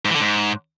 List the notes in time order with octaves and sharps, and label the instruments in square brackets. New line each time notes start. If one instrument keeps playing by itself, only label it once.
[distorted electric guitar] G#2
E3
D3
G#2